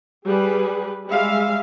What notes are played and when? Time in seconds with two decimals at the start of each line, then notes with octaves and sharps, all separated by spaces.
0.24 G3 G#4 B4
1.07 G3 G#3 E5 F5